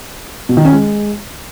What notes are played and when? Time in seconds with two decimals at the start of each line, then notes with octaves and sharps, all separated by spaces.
0.49 B2
0.57 D#3
0.65 C#4
0.72 G#3